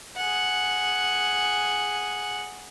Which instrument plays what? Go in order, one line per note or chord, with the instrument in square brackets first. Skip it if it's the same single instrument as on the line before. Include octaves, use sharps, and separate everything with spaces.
[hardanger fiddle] G#4 F#5